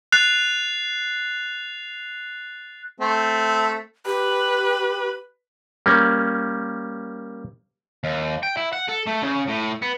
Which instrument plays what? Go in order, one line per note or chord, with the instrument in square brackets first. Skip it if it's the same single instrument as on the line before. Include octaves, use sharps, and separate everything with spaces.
[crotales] F#6 A6 C7 F7
[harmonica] A3 C4
[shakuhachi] G4 [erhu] B4
[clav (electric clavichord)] G3 A#3 C#4
[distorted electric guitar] D#2
G5
E4
F#5
A4
A3
C#3
A2
B3